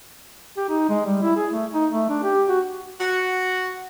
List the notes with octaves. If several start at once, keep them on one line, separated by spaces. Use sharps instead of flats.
G4
D#4
G#3
G3
E4
G#4
A3
D#4
A3
D4
G4
F#4
F#4